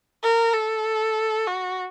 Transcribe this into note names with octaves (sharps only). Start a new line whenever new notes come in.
A#4
A4
F#4